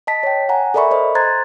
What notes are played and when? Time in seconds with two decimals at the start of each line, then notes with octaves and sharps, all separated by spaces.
0.07 D#5 A5 B6
0.23 C#5 G5
0.49 F#5 G#5 A#5
0.74 A4 A#4 D5 E5 B5 C#6
0.91 A4 C5 D#5
1.15 C5 A#5 C6 F#6 G#6 A6